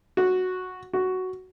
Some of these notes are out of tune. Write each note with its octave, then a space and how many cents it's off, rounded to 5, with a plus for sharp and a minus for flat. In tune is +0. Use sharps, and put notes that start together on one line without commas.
F#4 -5
F#4 +5